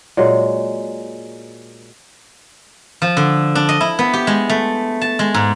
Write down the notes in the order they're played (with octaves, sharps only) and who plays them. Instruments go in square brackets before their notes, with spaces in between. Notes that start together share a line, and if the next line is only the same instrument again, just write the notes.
[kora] A#2 F#3 G#3
[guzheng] F3
D3
D4
D#5
E4
B3
G4
G#3
A3
A5
G#3
G#2